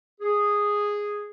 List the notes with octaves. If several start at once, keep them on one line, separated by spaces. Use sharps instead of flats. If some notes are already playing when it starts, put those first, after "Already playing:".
G#4